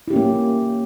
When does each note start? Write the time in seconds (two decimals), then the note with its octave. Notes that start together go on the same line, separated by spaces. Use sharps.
0.08 E4
0.10 G4
0.13 C#4
0.16 A#3